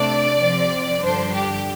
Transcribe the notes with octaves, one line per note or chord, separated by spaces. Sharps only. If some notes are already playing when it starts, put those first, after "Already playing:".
Already playing: C3 A3 D4 D5
C3 F3 C4
G2 D3 F3 D4 C5
G4